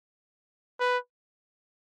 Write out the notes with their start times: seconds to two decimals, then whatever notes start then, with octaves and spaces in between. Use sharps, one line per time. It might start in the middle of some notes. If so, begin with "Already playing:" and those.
0.80 B4